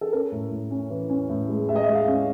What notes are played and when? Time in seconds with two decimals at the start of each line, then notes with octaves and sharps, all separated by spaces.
0.01 A4
0.12 C#4 A#4
0.32 A2
0.51 A2
0.71 C#4
0.90 E3
1.10 C#4
1.29 A2
1.49 G#3
1.69 G#3 E5
1.76 D#5
1.83 E5
1.89 G#3
1.94 F5
2.07 C#4